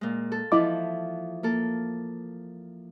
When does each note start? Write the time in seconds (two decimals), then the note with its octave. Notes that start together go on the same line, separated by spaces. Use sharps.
0.01 A#2 G#3
0.32 A4
0.52 E3 F3 E4 D#5 D6
1.43 A#3 A4